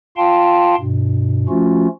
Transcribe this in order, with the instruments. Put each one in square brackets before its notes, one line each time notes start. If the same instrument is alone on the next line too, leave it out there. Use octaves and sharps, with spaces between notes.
[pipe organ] F4 F5 G5 A5 C6
G2 B2
F3 A3 C#4 F4 F#4